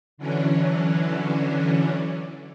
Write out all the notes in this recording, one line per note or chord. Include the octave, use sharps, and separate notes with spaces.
D3 E3 F#3 C#4 D4